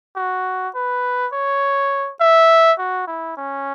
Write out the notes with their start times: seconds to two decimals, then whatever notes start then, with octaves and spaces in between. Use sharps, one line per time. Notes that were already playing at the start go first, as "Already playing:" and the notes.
0.16 F#4
0.75 B4
1.33 C#5
2.20 E5
2.79 F#4
3.07 E4
3.37 C#4